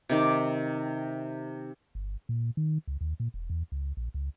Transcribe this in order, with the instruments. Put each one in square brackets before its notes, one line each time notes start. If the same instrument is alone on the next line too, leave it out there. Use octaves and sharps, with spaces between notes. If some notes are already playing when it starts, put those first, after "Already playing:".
[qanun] C3 D#3 D6
[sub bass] G1
A#2
D#3
C#2
D#2
A#2
E1
E2
C#2
A#1
C#2